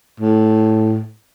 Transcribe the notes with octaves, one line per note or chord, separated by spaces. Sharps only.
A2